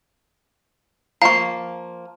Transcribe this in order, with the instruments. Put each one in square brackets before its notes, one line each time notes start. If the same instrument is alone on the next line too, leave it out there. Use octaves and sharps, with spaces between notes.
[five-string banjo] F3 A#3 [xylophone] F5 [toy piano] A#5 C#6